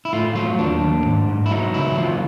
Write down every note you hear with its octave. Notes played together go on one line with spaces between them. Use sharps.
E4
A2 F4
F#3 F4
D#2 D4
D#2
G#2
G#2
E4
F#3 D#4
C#2 E4
E3 F4